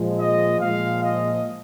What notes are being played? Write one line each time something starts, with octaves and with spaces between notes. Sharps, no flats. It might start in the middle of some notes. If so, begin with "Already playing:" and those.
Already playing: A#2 F3 G#3
D#5
A#2 F3 G#3 F5
D#5